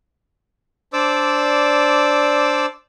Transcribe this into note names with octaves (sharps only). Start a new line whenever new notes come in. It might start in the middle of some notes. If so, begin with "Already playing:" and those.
D4 C5 D5 D6 E6